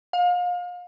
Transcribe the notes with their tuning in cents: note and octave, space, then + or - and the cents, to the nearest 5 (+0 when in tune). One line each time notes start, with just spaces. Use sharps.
F5 +35